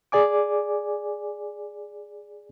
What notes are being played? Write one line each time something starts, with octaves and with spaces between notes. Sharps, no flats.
G#4 D5 G#5 D6